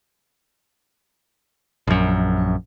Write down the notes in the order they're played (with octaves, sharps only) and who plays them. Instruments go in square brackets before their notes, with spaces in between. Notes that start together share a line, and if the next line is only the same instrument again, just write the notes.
[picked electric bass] A#1 F#2